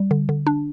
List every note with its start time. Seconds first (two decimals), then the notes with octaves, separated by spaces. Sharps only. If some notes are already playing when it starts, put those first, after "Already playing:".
Already playing: G3
0.11 D3
0.29 D3
0.47 D4